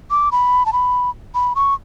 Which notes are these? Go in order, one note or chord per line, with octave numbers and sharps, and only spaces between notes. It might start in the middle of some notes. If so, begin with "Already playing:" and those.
D6
B5
A5
B5
B5
C#6